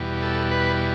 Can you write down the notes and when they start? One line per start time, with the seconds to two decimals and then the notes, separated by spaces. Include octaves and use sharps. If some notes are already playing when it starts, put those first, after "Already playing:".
Already playing: E2 B2 G3
0.22 A4
0.51 B4